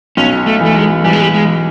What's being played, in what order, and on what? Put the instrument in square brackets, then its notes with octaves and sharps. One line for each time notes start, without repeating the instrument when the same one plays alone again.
[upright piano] B1 [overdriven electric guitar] C#4
[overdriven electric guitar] A3
[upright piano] E3 [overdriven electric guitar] A3
[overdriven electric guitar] G#3
[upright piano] E3 [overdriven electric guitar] G3
[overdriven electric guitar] G#3
G3
G#3